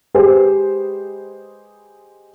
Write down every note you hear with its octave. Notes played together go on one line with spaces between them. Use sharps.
G#3 G4 G#4 B4 C5